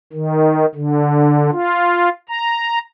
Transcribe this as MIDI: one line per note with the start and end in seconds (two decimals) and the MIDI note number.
0.13 0.66 51
0.75 1.50 50
1.52 2.09 65
2.29 2.79 82